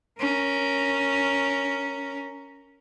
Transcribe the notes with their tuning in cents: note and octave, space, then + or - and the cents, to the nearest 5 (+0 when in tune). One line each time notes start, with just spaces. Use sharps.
C#4 +5 A#4 +0